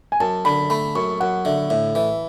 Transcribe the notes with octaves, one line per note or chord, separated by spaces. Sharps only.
G#5
F#2 A5
D3 B5
A3 B5
F#2 C#6
F#2 F#5
D3 E5
A2 E5
E3 E5